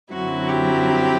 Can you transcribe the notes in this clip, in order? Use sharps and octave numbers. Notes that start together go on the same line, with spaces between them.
F#2 D3 F#3 C4 E4 F#4
G4